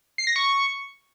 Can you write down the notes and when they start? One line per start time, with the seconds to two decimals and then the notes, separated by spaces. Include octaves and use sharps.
0.18 C7
0.27 A#6
0.36 C#6